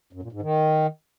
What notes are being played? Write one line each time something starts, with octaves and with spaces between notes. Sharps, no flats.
F#2
A#2
G#2
D#3